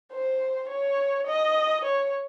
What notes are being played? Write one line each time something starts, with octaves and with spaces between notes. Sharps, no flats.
C5
C#5
D#5
C#5